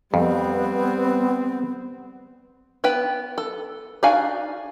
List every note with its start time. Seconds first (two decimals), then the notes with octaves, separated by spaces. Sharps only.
0.14 F2 G3 B3 C4
2.84 B3 B4 G5
3.38 A4
4.03 D4 D#4 F#4 F5 G#5